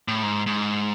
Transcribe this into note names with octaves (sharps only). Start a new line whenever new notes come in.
A2
G#2
G#2